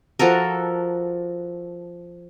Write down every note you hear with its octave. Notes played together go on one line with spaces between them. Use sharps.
F3 F#4 A4 A#4